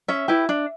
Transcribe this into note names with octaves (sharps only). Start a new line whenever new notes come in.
C#4 E5
E4 G4 B4
D4